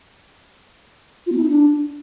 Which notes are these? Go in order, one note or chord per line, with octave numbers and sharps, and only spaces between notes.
F4
B3
E4
D#4
D4